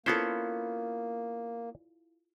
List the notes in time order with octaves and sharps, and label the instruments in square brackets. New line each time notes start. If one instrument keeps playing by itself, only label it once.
[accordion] A#3 [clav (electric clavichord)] B3 C#4 C5 [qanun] E4 F4 A4